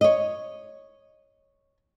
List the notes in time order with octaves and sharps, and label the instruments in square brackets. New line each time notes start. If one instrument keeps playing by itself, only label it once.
[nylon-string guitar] C#5 D#5